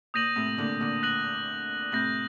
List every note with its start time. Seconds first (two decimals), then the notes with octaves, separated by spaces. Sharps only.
0.14 A#2 D#6 G6 A#6 D#7 F#7
0.36 A2 C3
0.58 A#2 D3
0.81 A#2 D3
1.03 F#6 A#6 D#7 F#7
1.92 A2 C3 G6 A#6 F#7